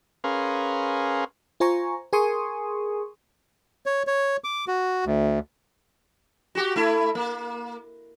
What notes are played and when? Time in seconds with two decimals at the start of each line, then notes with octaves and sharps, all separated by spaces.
0.24 C#4 G#4 A#4 B4 F5 C6
1.60 F4 C5 G#5 A#5 C#6
2.13 G#4 A#4 G#5 C6 C#6 D#6
3.86 C#5
4.07 C#5
4.44 D6
4.68 F#4
5.06 D2
6.55 F#4 G4
6.76 A3 E4
7.15 A#3